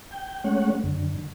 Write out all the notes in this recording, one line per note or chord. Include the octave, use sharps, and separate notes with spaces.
G5
G#3 A3 C#4 C#5 F#5
F#2 D3